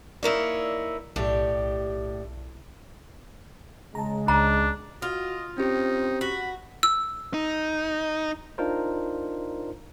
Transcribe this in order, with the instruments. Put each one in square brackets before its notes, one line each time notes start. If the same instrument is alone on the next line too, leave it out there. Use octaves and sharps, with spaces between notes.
[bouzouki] A#3 D#4 [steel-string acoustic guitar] E4 A#4 C#5 [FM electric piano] D5 E6
[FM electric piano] B1 [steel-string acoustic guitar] A2 [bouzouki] D4 G4
[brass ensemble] C#3 G#3 [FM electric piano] A5 A#5
[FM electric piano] C#2 [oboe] D4 [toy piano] A#5
[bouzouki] F4 [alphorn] F#4 [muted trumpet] D#5
[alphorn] C4 [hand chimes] C#4 G4 [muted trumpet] D#4
[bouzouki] F#4 [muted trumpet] B5
[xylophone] E6
[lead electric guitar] D#4
[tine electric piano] D4 D#4 F4 A#4 C5